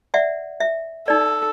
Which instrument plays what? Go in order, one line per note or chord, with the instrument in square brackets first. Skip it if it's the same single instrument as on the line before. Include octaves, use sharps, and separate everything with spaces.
[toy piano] D5 E5 F#5
E5
[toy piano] D#4 D5 [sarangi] A4